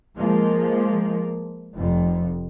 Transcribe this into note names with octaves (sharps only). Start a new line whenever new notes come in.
F3 G#3 A#3
F1 F2